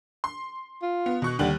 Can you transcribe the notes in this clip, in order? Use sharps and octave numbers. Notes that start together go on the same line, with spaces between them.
C6
F4
B3
B2 C#6 F#6
D#2 D3 G3 F#7